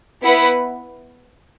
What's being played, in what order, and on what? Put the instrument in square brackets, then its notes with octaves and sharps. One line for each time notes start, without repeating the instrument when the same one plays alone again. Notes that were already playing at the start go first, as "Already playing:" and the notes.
[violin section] B3 E4 B4 F#5